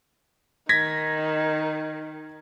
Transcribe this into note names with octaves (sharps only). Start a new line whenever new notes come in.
D#3 G#6 A#6 B6